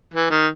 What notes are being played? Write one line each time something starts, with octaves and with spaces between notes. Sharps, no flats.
E3
D#3